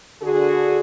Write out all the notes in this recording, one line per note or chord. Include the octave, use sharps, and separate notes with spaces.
D3 F#4 G#4